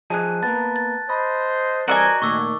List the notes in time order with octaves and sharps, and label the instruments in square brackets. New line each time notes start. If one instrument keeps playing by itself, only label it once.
[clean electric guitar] F3 G#4 D#5 [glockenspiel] A5 F#6
[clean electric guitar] A#3 B3 [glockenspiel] A5 A6
[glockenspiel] A6
[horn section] C5 D#5 [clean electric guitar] B5
[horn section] E3 G3 C4 [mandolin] F#4 D#5 G#5 [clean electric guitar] A#4 D5
[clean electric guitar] A#2 A3 [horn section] D#3 [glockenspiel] C#6 D6 E6